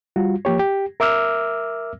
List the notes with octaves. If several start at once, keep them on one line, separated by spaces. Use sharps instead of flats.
G3 F4 F#4
F3 A#3 G4 C#5
G4
A#4 E5 D6 E6 F6